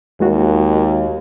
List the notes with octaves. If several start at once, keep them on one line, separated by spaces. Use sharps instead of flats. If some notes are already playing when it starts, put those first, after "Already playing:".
D#2 G#3 F4 F#4